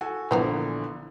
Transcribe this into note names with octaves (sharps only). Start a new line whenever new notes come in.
F#4 A4 G#5
A#1 D3 E3 F3 B3 A#4